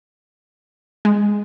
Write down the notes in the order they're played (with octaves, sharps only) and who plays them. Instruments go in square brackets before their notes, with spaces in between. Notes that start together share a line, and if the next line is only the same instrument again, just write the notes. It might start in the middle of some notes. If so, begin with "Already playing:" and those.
[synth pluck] G#3